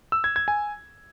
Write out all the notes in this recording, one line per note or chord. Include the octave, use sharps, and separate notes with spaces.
E6
G#6
G#6
G#5